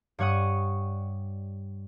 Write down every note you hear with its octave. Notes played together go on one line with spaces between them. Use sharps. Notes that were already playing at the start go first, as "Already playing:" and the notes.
G2 G3 C#5 F#5 C#6 D#6